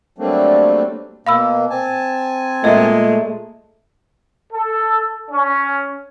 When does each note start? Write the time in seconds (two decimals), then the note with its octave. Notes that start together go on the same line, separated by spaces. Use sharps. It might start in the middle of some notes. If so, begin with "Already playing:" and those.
0.18 F#3 G3 A3 A#3 C4 D4
1.27 B2 A#3 F5 B5 E6
1.70 C4 G#5 A5
2.64 A#2 G#3 A3 D#5 E5
4.52 A4
5.30 C#4